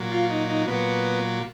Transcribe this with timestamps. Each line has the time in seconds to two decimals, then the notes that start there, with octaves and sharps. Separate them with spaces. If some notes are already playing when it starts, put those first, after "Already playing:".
Already playing: A#2 F#3
0.12 F4
0.30 D#4
0.49 D#4
0.68 A#2 F#3 B3